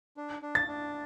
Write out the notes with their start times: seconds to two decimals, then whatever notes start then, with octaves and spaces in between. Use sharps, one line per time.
0.17 D4
0.42 D4
0.55 A6
0.68 D4